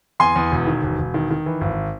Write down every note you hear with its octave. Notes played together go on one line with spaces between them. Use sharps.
E2 G#5 C6
E2
E1
D#3
E1
E1
D#3
D#3
E3
G#1